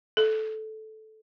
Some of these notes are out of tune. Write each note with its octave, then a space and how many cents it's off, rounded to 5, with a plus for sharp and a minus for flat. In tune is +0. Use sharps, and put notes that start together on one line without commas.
A4 -10